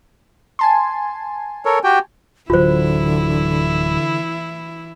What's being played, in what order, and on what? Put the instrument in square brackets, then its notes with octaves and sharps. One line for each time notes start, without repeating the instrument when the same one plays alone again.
[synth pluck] G#5 A5 C6
[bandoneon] A4 A#4 C#5
F#4 G4 G5
[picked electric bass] D1 F#3 [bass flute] D3 [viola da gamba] E3 E4 [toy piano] F4 C5